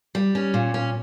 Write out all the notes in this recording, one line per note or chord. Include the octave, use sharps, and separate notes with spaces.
G3
C#4
A#2
C#4